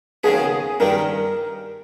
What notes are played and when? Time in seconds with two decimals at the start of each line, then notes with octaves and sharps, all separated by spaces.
0.24 D#2 C#3 G#3 B3 G#4
0.80 G2 D#3 G3 A#4